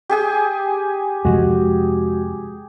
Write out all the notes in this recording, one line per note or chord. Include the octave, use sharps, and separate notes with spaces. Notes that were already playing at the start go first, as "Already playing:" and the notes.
G4 G#4 G#5
F2 C3 F3 G#3 F#4